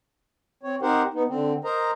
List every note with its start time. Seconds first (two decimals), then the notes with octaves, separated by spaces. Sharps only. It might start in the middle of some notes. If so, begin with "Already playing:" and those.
0.63 C4 C#5
0.82 C4 D#4 G4 A#4 C5 F#5
1.14 B3 D#4
1.29 D3 C4
1.64 A#4 C5 D#5 A#5